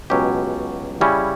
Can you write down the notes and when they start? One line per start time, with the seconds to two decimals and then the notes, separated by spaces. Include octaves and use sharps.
0.10 C#2 B2 F#3 C#4 G4
1.01 C#3 G3 C#4 E4